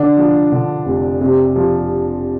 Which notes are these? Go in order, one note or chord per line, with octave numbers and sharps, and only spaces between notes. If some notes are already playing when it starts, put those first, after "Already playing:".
Already playing: D3 D4
F3
D3
F1
C3
F3